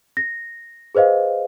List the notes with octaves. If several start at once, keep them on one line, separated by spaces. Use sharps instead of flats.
A#6
G#4 B4 C5 D#5 F5